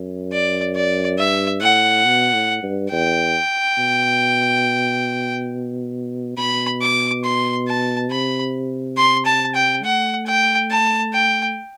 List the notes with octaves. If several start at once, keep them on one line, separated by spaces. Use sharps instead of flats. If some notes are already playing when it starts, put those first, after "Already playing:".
Already playing: F#2
D5
D5
G2 E5
A2 F#5
B2
A2
G2
E2 G5
B2
B2 B5
D6
C6
A5
C3 B5
C6
A5
G5
A3 F#5
G5
A5
G5